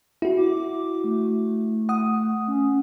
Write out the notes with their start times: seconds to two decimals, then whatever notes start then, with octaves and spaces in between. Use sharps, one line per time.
0.22 E4 F#4
0.37 D6
1.04 A3
1.89 F#5 D#6
2.48 C#4